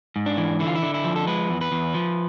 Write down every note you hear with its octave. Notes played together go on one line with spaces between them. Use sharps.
G#2
D4
E3
D3 E4
F4
E4
D3
E4
F3
A4
G#3 B4
E2
B4
E2
F3